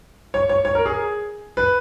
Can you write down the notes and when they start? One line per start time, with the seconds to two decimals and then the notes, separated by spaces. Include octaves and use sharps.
0.34 C#5
0.49 C#5
0.65 C#5
0.75 A#4
0.86 G#4
1.57 B4